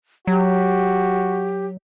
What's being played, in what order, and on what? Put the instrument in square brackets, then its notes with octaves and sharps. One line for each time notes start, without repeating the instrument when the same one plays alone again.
[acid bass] F#3 [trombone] F#4 [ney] G4